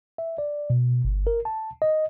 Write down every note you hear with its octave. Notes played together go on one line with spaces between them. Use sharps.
E5
D5
B2
G1
A#4
A5
D#5